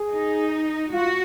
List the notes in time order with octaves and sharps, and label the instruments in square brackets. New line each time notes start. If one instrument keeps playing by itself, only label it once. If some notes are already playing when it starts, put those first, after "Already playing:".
Already playing: [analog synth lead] G#4
[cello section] D#4
[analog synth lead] F4 [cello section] F#4